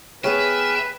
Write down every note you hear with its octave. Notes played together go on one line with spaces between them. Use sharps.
B3 G#4 B4 C#5 E5 G5 G#5 F6